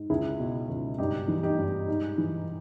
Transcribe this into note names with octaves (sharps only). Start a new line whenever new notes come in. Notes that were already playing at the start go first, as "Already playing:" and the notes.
Already playing: G#2
C#2 E4 G#4
B2
C#2
G2 D#4 G4
E3
D#4 G4
G2
G#2
E3